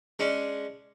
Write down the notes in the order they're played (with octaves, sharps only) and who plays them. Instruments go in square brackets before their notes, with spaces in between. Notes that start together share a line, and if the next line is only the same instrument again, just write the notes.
[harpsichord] G#3 C#4 D4